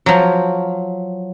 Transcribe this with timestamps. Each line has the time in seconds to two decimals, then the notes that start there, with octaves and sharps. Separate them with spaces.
0.06 F3 F#3